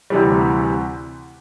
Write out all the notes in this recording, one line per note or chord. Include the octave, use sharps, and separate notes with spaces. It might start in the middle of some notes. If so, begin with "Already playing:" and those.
D2 C3 E3 G3